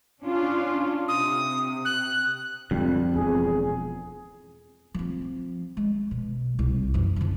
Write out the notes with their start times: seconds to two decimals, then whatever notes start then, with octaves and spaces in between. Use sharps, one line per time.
0.21 C#4 D4 F4
1.08 C3 D#6
1.85 F#6
2.71 F2 G#2 D3 G3
3.16 E1 E2 G#4
4.94 F3 C4
5.77 G#3
6.11 B2
6.59 C2
6.94 F#2 E3
7.16 D3 C4